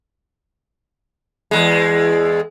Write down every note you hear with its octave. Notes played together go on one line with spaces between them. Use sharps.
E2 G#3